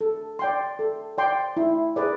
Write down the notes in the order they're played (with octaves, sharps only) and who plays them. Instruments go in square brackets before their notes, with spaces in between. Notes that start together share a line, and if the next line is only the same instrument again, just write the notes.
[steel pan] A4
D5 G5 C6
A4
D5 G5 C6
E4
G#4 B4 D5